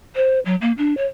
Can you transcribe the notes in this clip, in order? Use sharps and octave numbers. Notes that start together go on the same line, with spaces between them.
C5
F#3
A#3
D4
C#5